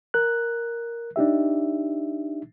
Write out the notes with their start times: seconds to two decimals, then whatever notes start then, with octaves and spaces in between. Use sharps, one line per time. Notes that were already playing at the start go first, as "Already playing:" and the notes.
0.14 A#4 F#6
1.16 D4 D#4 G4 E5